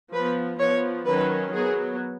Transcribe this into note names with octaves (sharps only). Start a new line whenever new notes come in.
F3 B3 B4
F3 B3 C#5
D#3 F#3 C#4 B4
F#3 B3 G#4